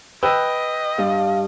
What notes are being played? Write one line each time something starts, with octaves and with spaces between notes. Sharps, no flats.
B4 D#5 G5 E6
G2 F5